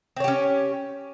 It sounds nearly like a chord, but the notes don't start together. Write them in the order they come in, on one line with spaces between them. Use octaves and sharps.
C4 C#5 G4 C#4